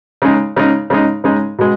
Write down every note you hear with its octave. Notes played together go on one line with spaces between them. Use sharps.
C#3 G#3 D#4
C#3 G#3 D#4
C#3 G#3 D#4
C#3 G#3 D#4
B2 G#3